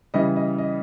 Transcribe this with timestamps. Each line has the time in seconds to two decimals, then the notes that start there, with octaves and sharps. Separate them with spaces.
0.14 C#3 E3 G3 D#5
0.36 D#5
0.58 D#5